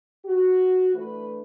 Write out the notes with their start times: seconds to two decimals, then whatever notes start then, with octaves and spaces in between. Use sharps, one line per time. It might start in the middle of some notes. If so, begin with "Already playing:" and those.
0.26 F#4
0.94 E3 A3 D4 B4